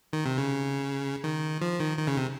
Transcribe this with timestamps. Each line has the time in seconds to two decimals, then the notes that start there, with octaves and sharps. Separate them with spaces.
0.13 D#3
0.25 C3
0.38 C#3
1.24 D#3
1.61 F3
1.80 D#3
1.98 D#3
2.07 C#3
2.17 C3